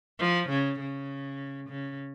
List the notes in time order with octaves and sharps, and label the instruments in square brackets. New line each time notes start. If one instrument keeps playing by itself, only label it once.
[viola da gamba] F3
C#3
C#3
C#3